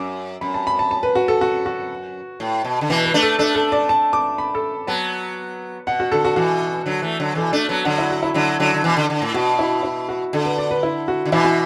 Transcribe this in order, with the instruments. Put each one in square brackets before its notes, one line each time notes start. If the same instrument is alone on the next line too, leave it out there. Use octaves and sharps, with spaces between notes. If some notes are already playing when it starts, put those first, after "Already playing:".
Already playing: [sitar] F#2 [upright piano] D6
[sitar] F#2 [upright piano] B5
[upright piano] A5
B5
A5
A5
B4
F#4
A4
F#4
F#4
[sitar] A2
B2
D3
[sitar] B2 E3 [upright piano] B4
[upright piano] B4
[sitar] A3 D4
[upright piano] A4
[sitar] A3 D4 [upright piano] A4
[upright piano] A4
D5
A5
D6
B5
A4
[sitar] F#3 B3 [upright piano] A5
[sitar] B2 [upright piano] F#5
[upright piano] F#4
[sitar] D3 [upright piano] A4
[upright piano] F#4
[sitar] B2 E3 [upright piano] F#4
[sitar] D3 F#3
E3 A3
D3 F#3
[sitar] B2 E3 [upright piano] A4
[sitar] A3 D4 [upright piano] A4
[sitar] F#3 B3 [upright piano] A5
[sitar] D3 F#3 [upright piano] F#5
[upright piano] E4
F#4
E4
[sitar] D3 F#3
D3 F#3
D3
B2 E3
D3
D3
A2
[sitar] B2 [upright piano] F#4
[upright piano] E4
E4
F#4
[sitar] D3 [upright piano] A4
[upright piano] B4
D5
B4
E4
F#4
[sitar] D3
[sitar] B2 E3 [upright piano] E4
[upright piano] F#4